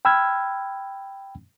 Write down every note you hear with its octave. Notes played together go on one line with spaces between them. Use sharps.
G5 B5 E6 F6 G#6